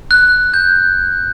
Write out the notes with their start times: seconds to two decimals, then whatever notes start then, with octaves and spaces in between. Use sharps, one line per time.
0.11 F#6
0.54 G6